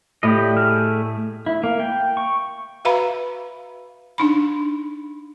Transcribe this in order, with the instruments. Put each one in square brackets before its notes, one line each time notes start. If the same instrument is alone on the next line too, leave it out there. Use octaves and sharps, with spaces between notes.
[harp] A2 [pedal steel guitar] G4 D5 D#5
[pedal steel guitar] A3 G#4 F6
E4
A#3
G5
C#6
[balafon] F#4 B4 E5 F5 A#5 B5
D4 D#4 B5